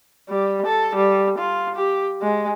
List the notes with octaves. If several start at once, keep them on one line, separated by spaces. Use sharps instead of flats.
G3
A4
G3
F4
G4
G#3